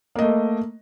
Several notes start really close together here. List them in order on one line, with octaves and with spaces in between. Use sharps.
A#3 D#5 A3